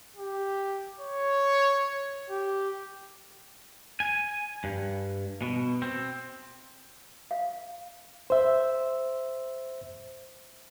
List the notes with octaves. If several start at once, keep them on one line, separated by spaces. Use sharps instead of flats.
G4
C#5
G4
G#5
G2
B2
C4
F5
C5 E5